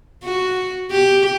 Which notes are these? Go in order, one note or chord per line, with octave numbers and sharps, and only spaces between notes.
F#4
G4